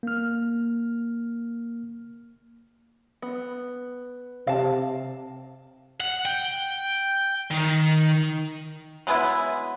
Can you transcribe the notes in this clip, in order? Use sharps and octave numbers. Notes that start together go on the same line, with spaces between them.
A#3 F6
B3
C3 F5 A5
F#5
G5
D#3
F#3 G#3 B3 E4